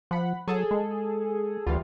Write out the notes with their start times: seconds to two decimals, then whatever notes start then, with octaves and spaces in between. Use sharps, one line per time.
0.11 F3 F#5 B5
0.48 F#3 G#4 A4
0.71 G#3
1.67 D2 E3 G3 F4